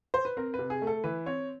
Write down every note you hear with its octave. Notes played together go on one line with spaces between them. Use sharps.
C5
B4
C4 A#4
B4
C3
G#4
A3
A4
E3 B4
C4 C#5